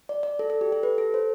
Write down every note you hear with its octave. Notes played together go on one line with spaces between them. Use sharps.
D5
D5
A4
A4
G4
A4
B4
A4
C5